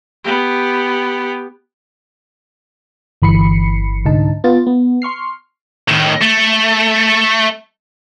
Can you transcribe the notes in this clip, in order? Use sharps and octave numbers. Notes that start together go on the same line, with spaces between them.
B3 G4
G1 E3 B5 C7 C#7
C2 G#2 D3 D#4 A5
B3 F4 A6
B3
C6 C#6 F6 C7
A2 D#3
A3